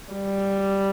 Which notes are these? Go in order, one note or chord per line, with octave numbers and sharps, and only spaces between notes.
G3